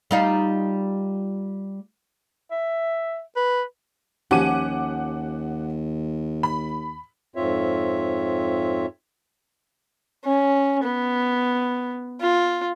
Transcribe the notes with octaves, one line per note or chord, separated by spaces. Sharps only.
G3 D#4 F4
E5
B4
D#2 F3 C#4 G4 F#5 D6 D#7
B5
F2 G#2 C4 F4 C#5 E5
C#4
B3
F4